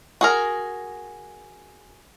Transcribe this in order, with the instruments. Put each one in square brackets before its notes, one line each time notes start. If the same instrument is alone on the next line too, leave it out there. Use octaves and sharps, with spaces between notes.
[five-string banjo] F#4 G#4 A#4